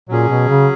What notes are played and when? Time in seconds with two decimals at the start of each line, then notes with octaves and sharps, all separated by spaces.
0.09 A#2 F#3 C#4 G#4
0.29 B2
0.49 C#3